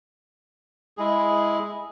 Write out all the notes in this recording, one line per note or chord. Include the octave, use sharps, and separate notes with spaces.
G#3 E4 G#4